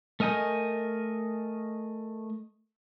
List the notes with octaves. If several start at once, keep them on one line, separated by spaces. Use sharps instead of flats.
A3 A#4 D#5 G#5 G6